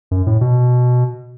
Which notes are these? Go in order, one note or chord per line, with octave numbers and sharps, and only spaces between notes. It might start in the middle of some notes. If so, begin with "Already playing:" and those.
F#2
A2
B2